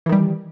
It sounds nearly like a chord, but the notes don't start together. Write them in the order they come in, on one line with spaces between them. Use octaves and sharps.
E3 D#3 G3